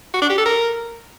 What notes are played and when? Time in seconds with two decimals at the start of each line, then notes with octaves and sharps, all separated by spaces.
0.14 F#4
0.22 D4
0.30 G4
0.38 A4
0.46 A#4